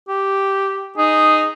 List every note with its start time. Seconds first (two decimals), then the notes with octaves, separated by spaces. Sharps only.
0.08 G4
0.98 D#4 G#4